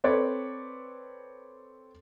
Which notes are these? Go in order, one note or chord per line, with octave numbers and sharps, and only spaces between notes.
C4 A4 B4 C#5 D5